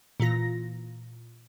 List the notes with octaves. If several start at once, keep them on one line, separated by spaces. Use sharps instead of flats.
A#2 E3 F4 A#6